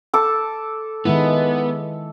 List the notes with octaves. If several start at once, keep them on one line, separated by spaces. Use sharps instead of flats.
A4 D6
D#3 G#3 B3 E4